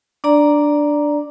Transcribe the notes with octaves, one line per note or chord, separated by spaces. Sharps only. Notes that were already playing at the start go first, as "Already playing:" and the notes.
D4 D5 A#5